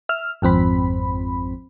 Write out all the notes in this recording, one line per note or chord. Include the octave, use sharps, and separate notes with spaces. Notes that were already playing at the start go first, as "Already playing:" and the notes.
E5 F6
G#1 F2 C4 B5